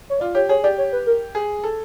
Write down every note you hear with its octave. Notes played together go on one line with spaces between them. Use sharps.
C#5
F4 D5
G4 C#5
G#4 C#5
G4 D5
C#5
B4
A#4
G#4
A4